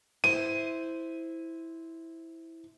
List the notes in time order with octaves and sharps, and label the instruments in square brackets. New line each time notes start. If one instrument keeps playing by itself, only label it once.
[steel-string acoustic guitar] E4 C5 [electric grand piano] D#7